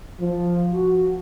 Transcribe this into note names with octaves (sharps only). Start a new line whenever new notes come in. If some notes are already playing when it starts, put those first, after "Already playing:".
F3
F#4